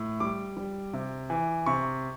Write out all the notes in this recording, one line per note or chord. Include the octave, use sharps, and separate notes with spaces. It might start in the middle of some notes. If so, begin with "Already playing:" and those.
Already playing: A2
G3 D6
G3
C3
E3
C3 C#6